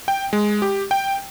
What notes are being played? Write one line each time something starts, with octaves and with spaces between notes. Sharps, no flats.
G5
G#3
G4
G5